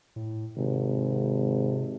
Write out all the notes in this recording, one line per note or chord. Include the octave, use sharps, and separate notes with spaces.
A2
G#1 C3